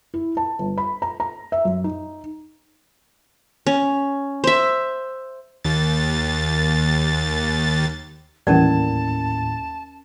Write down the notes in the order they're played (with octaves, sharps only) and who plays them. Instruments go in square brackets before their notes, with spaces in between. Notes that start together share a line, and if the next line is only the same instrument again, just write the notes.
[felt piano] E4
A5
G1
B5
A#5
A#5
E5
F#2
D#4
[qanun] C#4
C5 E5
[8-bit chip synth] D#2 A6
[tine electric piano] D#2 A2 [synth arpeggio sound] E3 G3 [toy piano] C#4 A#4 D5 [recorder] A5